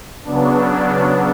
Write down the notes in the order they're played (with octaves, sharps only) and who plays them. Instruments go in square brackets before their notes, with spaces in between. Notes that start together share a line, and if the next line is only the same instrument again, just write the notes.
[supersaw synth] C#3 F#3 B3 D4